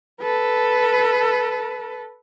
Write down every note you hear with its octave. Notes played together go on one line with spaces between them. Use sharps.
A4 B4